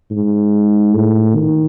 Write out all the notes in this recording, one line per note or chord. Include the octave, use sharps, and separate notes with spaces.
G#2
A2
D#3